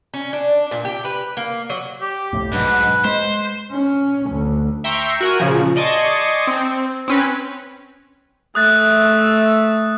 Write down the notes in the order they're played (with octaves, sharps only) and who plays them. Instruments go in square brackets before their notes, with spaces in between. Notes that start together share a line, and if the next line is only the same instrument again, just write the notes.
[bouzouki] C#4
D4
A#2
G4
B4
A#3
F#3
[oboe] G4
[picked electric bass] C2 F2 A2
[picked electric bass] B1 F#3 D4 [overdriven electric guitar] G#2 [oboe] B4
[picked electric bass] G#3 [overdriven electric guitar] C5
[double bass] C#4
D2
[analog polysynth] E5 G5 A#5 C6 C#6
F#4 A#4 G#5
A#2 C#3 F3
D5 D#5 G#5 A5 C6 C#6
C4
C4 C#4 B4
[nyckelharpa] A3 E5 [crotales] D#6 F#6 A6